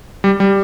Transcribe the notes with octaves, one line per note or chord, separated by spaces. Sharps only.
G3
G3